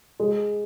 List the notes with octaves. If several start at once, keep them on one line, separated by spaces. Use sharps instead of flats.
G#3